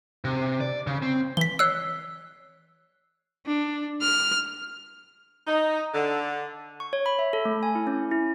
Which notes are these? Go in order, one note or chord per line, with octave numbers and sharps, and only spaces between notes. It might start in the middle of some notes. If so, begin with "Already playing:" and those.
C3
D5
C#3
C4
E3 B6 G7
C#5 E6 F#6 C7
D4
F6
D#4
D3
C#6
C#5
B5
E5
A4
A3
G#5
E4
C#4
E4